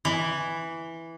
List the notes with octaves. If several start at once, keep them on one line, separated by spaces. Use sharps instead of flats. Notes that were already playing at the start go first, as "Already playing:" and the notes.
E3